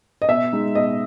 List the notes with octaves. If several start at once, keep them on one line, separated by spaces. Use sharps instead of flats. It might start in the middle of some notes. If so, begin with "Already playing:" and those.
D#5
B2 E5
G#3 D#4
B2 D#5